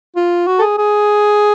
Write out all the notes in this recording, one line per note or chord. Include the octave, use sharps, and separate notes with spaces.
F4
F#4
A4
G#4
G#4